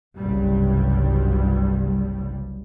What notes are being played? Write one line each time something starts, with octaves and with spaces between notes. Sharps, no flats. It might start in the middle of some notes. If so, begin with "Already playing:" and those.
F#1 C2 G2 G3